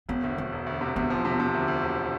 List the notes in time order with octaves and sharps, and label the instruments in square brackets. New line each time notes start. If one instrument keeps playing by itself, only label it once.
[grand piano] E1 [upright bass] B3
[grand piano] D2
[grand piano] D2 [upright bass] D4
[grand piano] E1
D2
C3
[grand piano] D2 [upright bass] B3
[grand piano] F3
C3
C3
D2
D2
E1